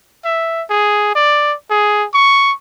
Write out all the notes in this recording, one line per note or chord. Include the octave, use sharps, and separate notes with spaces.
E5
G#4
D5
G#4
C#6